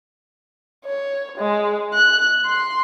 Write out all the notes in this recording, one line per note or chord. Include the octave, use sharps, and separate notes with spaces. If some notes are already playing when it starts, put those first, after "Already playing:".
C#5
G#3
F#6
C6